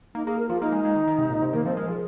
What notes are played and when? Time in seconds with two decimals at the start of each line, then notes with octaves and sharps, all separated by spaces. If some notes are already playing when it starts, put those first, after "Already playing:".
0.15 A#3 D#4
0.26 A#3 G#4
0.39 A#4
0.49 F3 F4
0.62 A#3 D#4
0.72 G#3
0.85 G#3
0.95 D#3
1.07 D#3
1.18 C3
1.30 A#2
1.42 C3
1.53 D#3 A#3
1.65 F3 C4
1.77 G#3 A#4
1.88 F3 G#4